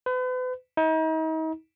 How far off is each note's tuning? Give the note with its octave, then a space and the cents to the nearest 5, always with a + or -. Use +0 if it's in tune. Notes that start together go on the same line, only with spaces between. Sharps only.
B4 +40
D#4 +40